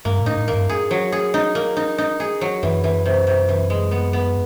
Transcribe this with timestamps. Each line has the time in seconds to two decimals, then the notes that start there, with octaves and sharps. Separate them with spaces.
0.05 G2 A#3
0.21 A2
0.26 D#4
0.37 A2
0.48 A#3
0.53 G2
0.69 G#4
0.91 F#3
1.12 G#4
1.34 D#4
1.55 A#3
1.77 D#4
1.98 D#4
2.20 G#4
2.41 F#3
2.63 F#2 E3
2.84 E3
3.06 C3
3.27 C3
3.49 E3
3.70 G#3
3.91 B3
4.13 B3